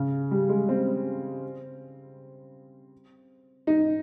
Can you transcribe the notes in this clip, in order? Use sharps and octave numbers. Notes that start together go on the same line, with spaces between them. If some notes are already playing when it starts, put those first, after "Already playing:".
Already playing: C#3
G3
G#3
C4
D#4